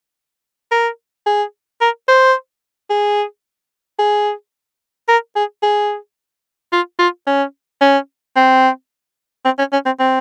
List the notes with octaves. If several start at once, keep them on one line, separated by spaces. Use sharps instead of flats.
A#4
G#4
A#4
C5
G#4
G#4
A#4
G#4
G#4
F4
F4
C#4
C#4
C4
C4
C#4
C#4
C4
C4